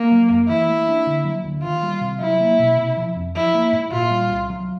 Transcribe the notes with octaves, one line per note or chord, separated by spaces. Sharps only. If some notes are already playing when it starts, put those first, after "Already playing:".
Already playing: A#3
F#3
F#2
E3 E4
A3
D4
D3
F#3
D2
D#3 F4
G3
C3
F#3 E4
A#3
B2
C3
F3
F2
F3 E4
A#3
G#2
A#2 F4
G3
C2
F#3